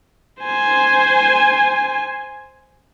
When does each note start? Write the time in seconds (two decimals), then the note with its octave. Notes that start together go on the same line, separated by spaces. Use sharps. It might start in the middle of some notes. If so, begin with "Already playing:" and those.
0.43 C5 G#5